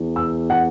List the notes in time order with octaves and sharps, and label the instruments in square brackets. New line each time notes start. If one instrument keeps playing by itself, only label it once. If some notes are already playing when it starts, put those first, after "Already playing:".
Already playing: [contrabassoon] E2
[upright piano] E6
F#5